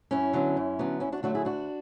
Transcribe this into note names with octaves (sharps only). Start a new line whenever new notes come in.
F#2 C#4 E4
D3 F#3 B3
F#2
D3 F#3 B3
D2 C#4 E4
D4 F#4
D3 F#3 A3 D4 F#4
E4 G#4
D2 D4 F#4